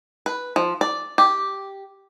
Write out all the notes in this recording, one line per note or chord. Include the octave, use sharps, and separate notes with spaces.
B4
F3
D5
G4